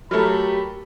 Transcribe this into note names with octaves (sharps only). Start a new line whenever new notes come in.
F#3 A3 G4 A4 A#4 B5